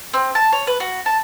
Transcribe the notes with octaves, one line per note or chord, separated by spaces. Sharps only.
C4
A5
C#5
B4
F#4
A5